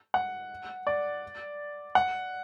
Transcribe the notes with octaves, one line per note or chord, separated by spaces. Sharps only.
F#5
D5
F#5